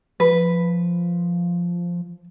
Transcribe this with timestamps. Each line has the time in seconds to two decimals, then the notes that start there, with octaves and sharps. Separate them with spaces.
0.20 F3 B4